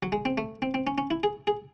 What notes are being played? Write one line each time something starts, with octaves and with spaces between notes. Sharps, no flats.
F#3
G#3
C4
A3
C4
C4
C#4
C#4
E4
G#4
G#4